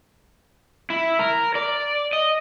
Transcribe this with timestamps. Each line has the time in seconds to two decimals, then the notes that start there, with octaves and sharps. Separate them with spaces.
0.90 E4
1.19 A#4
1.55 D5
2.13 D#5